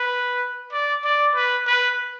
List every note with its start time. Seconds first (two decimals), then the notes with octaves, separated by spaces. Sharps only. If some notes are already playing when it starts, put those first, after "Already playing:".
Already playing: B4
0.72 D5
1.04 D5
1.35 B4
1.67 B4